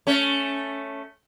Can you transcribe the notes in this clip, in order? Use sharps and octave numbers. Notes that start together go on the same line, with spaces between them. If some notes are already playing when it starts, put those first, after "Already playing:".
A3 C#4